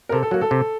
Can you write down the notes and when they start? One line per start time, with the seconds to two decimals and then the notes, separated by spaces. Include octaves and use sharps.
0.09 A#4
0.12 C3 A4
0.23 A4
0.31 F#3 F#4
0.34 A#3
0.41 A4
0.51 C3